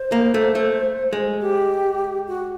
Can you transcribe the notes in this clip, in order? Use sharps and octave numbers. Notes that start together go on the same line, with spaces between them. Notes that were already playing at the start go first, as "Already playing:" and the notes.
Already playing: C5
A#3
A3
A3
G#3
G4
F#4